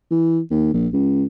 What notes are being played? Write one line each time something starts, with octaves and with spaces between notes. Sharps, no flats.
E3
D#2
A#1
C#2